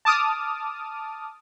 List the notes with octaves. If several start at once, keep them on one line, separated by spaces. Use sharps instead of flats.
A5 D6 D#6 F6